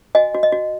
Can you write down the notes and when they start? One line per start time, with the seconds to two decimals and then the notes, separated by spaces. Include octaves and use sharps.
0.15 F#4 D#5 G#5
0.34 F#4
0.43 D#5
0.52 F#4